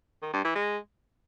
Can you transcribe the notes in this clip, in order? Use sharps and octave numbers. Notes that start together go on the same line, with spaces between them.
D#3
G2
E3
G#3